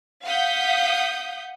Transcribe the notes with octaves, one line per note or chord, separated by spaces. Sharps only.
F5 F#5 D#6 G6 B6